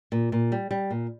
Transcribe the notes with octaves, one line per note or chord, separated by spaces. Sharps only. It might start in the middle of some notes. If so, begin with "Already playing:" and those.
A#2
A#2
G3
G3
A#2